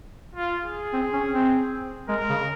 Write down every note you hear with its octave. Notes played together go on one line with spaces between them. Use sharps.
F4
G#4
C4
C#4
C4
G#3 A#4
C#3